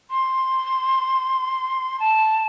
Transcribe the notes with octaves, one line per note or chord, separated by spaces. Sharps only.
C6
A5